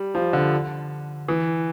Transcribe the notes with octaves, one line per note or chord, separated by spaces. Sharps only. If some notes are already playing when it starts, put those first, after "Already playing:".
Already playing: G3
F3
D3
E3